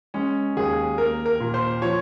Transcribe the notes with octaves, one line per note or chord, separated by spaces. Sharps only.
G#3 C#4
D#2 G#4
A#3 A#4
A#4
A#2
C5
F3 C#5